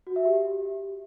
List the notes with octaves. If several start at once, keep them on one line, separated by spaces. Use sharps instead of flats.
F#4
E5
G4